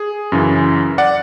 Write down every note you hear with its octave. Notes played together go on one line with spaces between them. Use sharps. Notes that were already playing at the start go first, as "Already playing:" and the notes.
Already playing: G#4
F#2 C#3 E3
D5 F#5